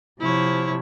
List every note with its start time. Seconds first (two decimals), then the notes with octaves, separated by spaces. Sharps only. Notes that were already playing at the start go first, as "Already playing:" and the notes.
0.20 C3 F3 E4 C#5